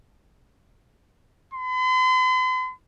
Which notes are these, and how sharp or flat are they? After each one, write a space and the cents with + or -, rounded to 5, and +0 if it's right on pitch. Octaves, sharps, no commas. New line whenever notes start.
C6 -45